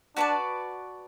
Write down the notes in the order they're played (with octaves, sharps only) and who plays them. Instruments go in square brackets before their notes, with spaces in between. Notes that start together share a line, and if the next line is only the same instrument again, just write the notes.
[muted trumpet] D4 [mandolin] F#4 B4 D5 A5